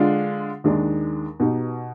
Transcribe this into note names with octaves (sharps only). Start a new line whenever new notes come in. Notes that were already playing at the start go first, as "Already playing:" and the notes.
Already playing: D3 G#3 D4 F4
D#2 D#3 G#3 D4
B2 B3 D#4 G4